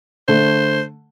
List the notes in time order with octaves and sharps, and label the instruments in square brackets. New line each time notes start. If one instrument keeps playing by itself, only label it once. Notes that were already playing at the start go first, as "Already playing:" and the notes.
[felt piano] D3 A3 [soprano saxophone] C5